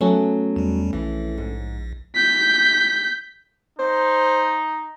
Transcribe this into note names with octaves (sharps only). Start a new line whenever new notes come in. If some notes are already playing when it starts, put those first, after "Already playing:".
F#3 A3 B3 C#4 A4
E2 G3
A#1 E3
G#2
G6 B6
D#4 C5